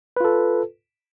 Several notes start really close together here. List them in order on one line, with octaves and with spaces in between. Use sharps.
B4 F4 A4